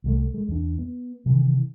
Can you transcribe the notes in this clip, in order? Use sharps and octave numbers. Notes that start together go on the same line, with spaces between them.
C2 G3 A3
G#3
E2 D4
B3
C3 D#3 E3